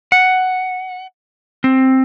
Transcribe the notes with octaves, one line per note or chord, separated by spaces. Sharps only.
F#5
C4